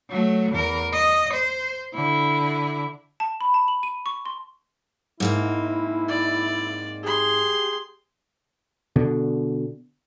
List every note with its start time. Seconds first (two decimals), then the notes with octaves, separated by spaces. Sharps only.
0.10 F#3 A3
0.52 E2 A#4
0.93 D#5
1.33 C5
1.95 D3 E4
3.20 A5
3.41 B5
3.54 A5
3.68 F#7
3.83 D#7
4.06 C#6
4.26 C6
5.20 G#2 A#3 C4 E4
6.09 D5
7.03 G4 G#4 C6
8.96 B2 D3